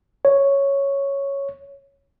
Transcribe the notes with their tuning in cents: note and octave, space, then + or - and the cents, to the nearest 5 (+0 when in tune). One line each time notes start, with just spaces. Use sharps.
C#5 +0